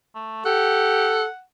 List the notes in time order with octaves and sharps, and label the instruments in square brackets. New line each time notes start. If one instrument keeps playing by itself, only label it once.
[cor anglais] A3
[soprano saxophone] G4 [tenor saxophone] A4 [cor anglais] F#5